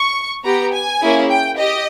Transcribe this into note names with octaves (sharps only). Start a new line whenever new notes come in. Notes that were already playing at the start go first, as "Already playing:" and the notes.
Already playing: C#6
B3 G4 A#5
G#5
A#3 C#4 E4 G#4
G5
G4 D#5